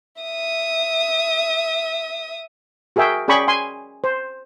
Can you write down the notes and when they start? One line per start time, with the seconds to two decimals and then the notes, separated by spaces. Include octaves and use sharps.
0.22 E5 D#6
2.96 F#4 G#4 A#4 E5 G5
3.28 C#4 G#4 D5 G5 B5 C#6
3.48 G#5 C6
4.04 C5